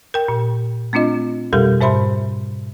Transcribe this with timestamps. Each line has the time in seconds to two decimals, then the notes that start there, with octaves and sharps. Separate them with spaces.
0.14 A#4 G5
0.28 A#2
0.93 A3 C4 D4 F4 D#5
1.53 F2 B2 G3 G4 A4 A#4
1.81 G#2 C5 E5 B5 C6